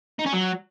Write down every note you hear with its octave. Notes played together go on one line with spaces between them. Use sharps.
D#4
C#4
F#3